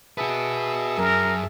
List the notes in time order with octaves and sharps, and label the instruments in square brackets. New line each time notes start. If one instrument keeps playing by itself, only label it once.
[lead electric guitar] F#4 B4 [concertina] G#4 E5 A5
[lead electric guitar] F#2 [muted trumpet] A#4